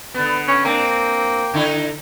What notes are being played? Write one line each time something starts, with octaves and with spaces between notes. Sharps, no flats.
D3 B3
C#4
A#3 C4 D4 G5
D3 D#4 E4